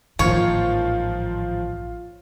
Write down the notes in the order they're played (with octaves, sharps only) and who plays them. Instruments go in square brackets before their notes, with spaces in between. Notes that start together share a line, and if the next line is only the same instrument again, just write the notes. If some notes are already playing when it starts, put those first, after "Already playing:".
[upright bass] A1 G#2 [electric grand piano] D#3 F3 A#3 [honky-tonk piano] F4 [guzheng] C#5